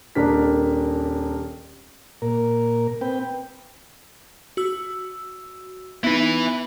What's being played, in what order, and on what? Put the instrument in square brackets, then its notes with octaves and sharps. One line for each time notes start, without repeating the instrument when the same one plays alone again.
[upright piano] D#1 D4 A#4 D5 B6
[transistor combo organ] A#2 A#4
C4 B4 G5
[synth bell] F#4 E6
[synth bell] B3 D#4 [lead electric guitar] E4 B4